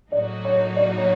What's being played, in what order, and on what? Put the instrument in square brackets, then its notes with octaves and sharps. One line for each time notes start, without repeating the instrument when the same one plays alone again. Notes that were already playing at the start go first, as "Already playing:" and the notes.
[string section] A2 F#3 A#3 D#4 F#4 [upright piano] D5
[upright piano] C#5
D5
C#5